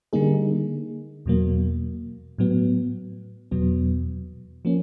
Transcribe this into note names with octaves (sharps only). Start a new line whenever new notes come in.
D3 G3 A#3 D#4 G#4
E2 B2 F#3 A#3
A2 F#3 B3
E2 B2 F#3 B3
F3 A#3 C#4